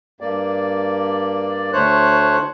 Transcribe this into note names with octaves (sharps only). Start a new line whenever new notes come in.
G2 A#3 D5
D2 A3 C5 C#5 F#6